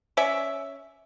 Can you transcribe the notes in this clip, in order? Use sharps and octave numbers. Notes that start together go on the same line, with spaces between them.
C#4 D5 E5